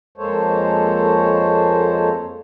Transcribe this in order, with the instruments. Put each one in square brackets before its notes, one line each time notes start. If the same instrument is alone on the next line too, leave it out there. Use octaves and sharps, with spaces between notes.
[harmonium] F2 G#3 A#3 A4 C5 C#5